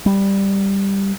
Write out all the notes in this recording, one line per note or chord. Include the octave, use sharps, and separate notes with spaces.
G3